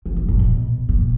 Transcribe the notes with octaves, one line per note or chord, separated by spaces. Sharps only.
C3
B2
A#2
B2
A#2